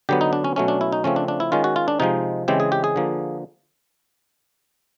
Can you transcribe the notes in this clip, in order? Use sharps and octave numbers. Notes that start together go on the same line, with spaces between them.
D3 F#3 B3 G4
D#4
D4
C#4
B2 F#3 A3 C#4
D4
E4
D#4
C#3 F3 A3 C4 C#4
D4
D4
E4
D#3 G#3 C#4 F4
F#4
F4
D4
C3 F3 G#3 D#4
C#3 E3 G#3 C4 G4
G#4
G4
G#4
D3 F3 A#3